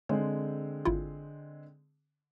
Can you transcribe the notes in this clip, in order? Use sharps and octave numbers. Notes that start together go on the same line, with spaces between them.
D3 G#3 C4 C#5
G#1 E4 F4